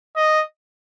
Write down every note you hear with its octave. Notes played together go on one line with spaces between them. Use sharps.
D#5